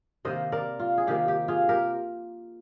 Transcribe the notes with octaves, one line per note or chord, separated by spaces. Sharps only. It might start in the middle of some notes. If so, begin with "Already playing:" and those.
C3 D#3 A#3 C5 D#5
A#4 D5
F4
G#4
C3 D#3 A#3 G4
G4
F4 G#4
G4 A#4